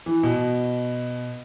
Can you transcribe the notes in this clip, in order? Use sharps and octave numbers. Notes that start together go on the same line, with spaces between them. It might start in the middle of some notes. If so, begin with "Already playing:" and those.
E3
B2